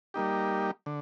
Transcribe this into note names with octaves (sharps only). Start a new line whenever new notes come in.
G3 A#3 D#4 G4
D3